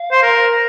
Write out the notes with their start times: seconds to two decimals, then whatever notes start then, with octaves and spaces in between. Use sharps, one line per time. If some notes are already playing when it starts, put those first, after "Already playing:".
Already playing: F5
0.12 C5
0.23 A#4